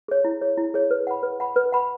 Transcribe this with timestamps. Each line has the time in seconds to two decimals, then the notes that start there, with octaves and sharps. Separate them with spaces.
0.08 G#4 C#5
0.25 E4
0.41 G#4 C#5
0.57 E4
0.74 G#4 C#5
0.91 B4
1.07 F#5 B5
1.23 B4
1.40 F#5 B5
1.56 B4
1.72 F#5 B5